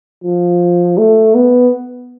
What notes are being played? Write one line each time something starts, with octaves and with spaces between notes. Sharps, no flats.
F3
A3
B3